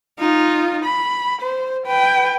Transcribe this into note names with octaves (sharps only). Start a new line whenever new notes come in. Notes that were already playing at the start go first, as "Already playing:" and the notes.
D#4 F4
B5
C5
B4 G5